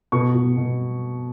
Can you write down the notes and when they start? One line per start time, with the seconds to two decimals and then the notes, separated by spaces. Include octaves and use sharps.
0.12 B2 C#6
0.34 B2
0.57 B2